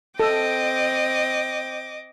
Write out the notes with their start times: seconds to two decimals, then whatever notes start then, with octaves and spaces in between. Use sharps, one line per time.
0.20 C4 A4 D#5 G5 D6